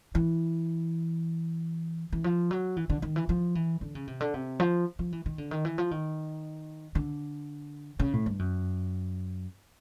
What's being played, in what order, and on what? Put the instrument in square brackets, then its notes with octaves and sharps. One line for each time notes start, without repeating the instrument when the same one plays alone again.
[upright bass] E3
E3
F3
F#3
E3
D3
D#3
E3
F3
E3
D3
C#3
C3
D3
C3
F3
F3
E3
D#3
D3
D#3
E3
F3
D#3
D3
C#3
A2
G2
F#2